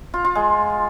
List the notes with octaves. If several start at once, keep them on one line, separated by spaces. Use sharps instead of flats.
F4
F4
G#3